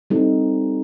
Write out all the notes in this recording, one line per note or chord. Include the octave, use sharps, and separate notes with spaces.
G3 C4 D#4 A4